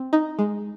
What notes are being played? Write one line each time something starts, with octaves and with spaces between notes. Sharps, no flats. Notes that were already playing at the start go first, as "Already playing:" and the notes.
Already playing: C4
D#4
G#3